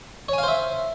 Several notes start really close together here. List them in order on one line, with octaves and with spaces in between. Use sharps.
C#5 G#5 F5 C5 E5